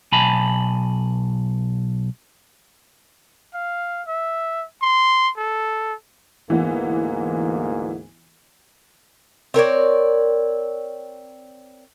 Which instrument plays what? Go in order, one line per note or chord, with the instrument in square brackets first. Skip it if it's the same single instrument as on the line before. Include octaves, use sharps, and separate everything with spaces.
[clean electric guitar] B1 G#5 A5 B5
[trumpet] F5
E5
C6
A4
[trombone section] D2 G#2 A#3 [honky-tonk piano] E3 B3
[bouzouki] C4 A#4 C#5 D5